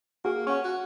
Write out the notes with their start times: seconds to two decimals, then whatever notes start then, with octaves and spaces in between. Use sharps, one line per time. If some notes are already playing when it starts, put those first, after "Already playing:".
0.25 A#3 F#4 G#4
0.47 C#4 F#5 C#6
0.65 F#4